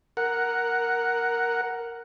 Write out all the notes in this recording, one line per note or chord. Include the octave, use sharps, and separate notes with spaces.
A#4 F#5